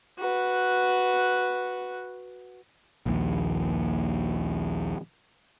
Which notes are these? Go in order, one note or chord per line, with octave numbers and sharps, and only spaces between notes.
F#4 B4
A#1 D#2